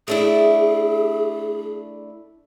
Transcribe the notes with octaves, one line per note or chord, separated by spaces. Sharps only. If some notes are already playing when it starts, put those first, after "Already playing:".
A3 D4 E4 G#4